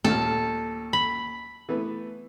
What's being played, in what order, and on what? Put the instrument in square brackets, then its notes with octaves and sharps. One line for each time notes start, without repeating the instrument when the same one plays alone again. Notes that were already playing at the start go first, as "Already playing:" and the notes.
[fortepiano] D#2 A#2 F6 [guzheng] A4
[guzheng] B5
[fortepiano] E3 A3 B3